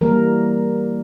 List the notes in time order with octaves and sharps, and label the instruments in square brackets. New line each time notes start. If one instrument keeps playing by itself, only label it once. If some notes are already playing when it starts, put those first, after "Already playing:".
[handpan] E3 G3 A#3 A#4